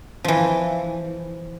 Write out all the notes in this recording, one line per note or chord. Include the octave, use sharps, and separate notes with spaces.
E3 F3